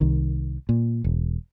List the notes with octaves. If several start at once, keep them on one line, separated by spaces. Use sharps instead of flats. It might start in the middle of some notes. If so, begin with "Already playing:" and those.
C2 D#3
A#2
E1